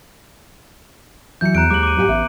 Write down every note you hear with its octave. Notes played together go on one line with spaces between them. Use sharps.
E3 F#3 G6 C#7
E2 A#5 F#6 D7
D#2 G#3 D6 F#7
D6 D#7
G#2 G4 G#5
A1 B3 E5